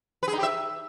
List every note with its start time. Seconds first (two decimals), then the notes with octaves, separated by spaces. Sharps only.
0.23 B4
0.28 G#4
0.33 D#4
0.38 G4
0.43 E5